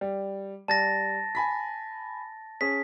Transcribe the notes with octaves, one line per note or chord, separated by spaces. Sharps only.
G3
G3 A5 A6 A#6
G#5 B5 B6
C#4 G#4 C#5 B6